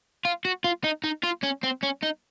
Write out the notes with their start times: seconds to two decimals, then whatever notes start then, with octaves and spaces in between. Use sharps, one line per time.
0.25 F4
0.45 F#4
0.64 F4
0.84 D#4
1.04 D#4
1.24 F4
1.43 C#4
1.64 C4
1.83 C#4
2.03 D#4